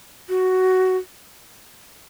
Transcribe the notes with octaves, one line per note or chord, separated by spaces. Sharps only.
F#4